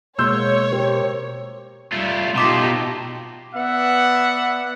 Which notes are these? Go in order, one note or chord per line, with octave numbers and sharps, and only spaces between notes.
B2 G#3 A#3 F#4 C#5 C6 E6 G6
G4 A#4 C5
G3 A3 F4
B2 D#4 F4 G4 A4 C6 D6 B6
B3 D5 E5 F#5